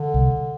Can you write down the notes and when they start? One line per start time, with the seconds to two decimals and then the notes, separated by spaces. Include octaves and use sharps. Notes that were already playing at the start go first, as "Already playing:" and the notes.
Already playing: D3
0.14 C2